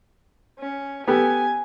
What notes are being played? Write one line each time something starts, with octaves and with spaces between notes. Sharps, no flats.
C#4
B3 G4 A4 G#5